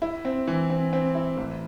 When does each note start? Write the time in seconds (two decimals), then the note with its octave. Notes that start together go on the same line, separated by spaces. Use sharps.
0.02 E4
0.25 C4
0.48 E3
0.70 C4
0.93 C4
1.15 E4
1.37 A1